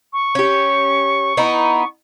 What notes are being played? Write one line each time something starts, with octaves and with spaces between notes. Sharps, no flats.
C#6
C#4 G4
B3 D#4 E4